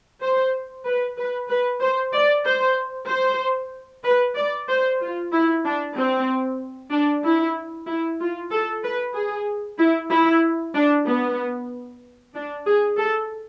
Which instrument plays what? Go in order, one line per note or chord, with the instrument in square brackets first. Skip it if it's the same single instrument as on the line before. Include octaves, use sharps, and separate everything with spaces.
[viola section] C5
B4
B4
B4
C5
D5
C5
C5
B4
D5
C5
F4
E4
D4
C4
D4
E4
E4
F4
A4
B4
G#4
E4
E4
D4
B3
D4
G#4
A4